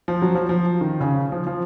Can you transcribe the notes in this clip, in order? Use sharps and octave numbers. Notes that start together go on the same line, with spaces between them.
F3
F#3
F3
F3
D#3
C#3
F3
F3